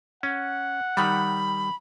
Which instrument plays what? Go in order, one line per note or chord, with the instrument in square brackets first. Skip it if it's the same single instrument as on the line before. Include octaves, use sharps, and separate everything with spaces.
[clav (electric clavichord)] C#4 [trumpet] F#5
[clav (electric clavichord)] D#3 G3 [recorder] B5